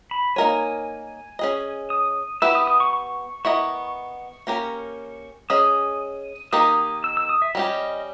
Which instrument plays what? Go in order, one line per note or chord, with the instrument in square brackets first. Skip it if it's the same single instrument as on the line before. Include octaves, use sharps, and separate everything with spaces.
[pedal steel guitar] B5
[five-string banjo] A#3 D#4 A#4 C#5 [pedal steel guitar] G#5
[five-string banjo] C#4 G#4 D#5
[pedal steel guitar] D#6
[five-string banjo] B3 E4 G4 B4 [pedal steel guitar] E6
[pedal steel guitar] D#6
D#6
C#6
C#6
[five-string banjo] B3 E4 A#4 D#5 [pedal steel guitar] C#6
[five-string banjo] A#3 C#4 G4 A#4
[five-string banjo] C#4 G#4 D#5 [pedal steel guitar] D#6
[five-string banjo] D#3 A#3 D#4 G4 A#4 [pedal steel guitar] D#6
[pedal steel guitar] E6
E6
D#6
E5
[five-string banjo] G3 C#4 G4 [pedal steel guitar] D#5